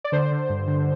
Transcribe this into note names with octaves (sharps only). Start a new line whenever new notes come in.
D5
D3 C5
D3
G2
D3